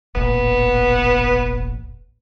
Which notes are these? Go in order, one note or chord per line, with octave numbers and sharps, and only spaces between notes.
E1 A1 A#2 B3